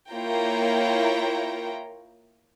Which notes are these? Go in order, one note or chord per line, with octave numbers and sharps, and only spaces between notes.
A#3 E4 F4 C#5 G5 A#5